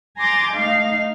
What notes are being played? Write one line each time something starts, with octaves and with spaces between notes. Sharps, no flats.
G#5 A#5 C6 D6 G6 A6
A3 D#4 F5